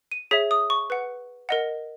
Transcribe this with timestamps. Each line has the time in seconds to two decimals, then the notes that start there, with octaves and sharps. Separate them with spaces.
0.11 D#7
0.31 G#4 C#5 E5 B6
0.51 D#6
0.70 C#6
0.90 B4 F#5
1.49 A#4 D#5 F#5